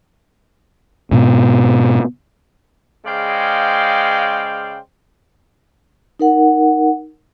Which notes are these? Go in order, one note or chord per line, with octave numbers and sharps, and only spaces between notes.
G#2 B2 B3
C#3 G#3 C5 D5 F5 G5
D#4 A#4 F#5